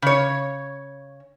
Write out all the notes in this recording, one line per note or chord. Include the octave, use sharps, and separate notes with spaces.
C#3 C#5